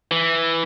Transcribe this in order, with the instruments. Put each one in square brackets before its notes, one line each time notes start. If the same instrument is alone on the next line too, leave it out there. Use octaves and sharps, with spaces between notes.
[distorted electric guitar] E3